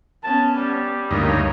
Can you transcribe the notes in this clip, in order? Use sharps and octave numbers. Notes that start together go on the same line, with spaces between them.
B3 C#4 A5
G3
D2 G2 A#3 D#4 C#5